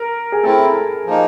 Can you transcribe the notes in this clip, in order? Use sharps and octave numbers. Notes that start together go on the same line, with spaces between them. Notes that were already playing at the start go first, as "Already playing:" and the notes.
Already playing: A#4
G#4
A3 C4 E4 A4
F3 A#3 D#4